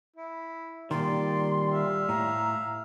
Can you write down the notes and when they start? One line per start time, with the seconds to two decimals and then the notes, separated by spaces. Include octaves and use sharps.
0.16 E4
0.91 A#2 D#3 G3 D5 C6
1.69 E5 F5
2.09 A2 A#5